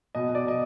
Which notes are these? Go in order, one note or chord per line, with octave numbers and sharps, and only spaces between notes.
B2 D#5
B2
D5
B2 D#5